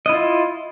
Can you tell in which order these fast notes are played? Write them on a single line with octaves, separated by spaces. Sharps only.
D#5 E4 F4